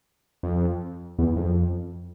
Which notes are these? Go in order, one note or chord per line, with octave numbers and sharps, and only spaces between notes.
F2
E2
F2